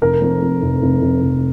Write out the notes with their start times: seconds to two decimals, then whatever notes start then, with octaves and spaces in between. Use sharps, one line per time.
0.02 F1 A#4
0.21 F2
0.42 F2
0.62 F1
0.82 F1
1.02 F1
1.22 F1